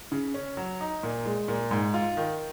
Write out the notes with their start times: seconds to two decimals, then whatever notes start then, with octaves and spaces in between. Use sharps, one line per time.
0.12 C#3
0.34 C#4
0.57 F#3
0.81 D#4
1.03 A#2
1.26 G#3
1.48 A#2
1.71 G#2
1.94 F4
2.17 D#3